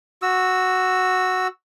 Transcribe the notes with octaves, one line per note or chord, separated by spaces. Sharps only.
F#4 E6